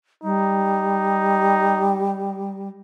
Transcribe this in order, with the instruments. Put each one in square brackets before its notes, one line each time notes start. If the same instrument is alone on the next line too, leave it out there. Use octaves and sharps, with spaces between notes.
[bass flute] G3 [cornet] D#4